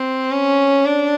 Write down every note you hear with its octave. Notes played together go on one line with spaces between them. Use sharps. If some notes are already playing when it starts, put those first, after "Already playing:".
Already playing: C4
C#4
D4